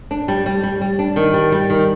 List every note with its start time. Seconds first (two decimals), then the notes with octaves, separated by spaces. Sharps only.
0.11 D4
0.28 G3
0.46 G3
0.63 G3
0.81 G3
0.99 D4
1.16 D#3
1.34 G3
1.52 G3
1.70 D#3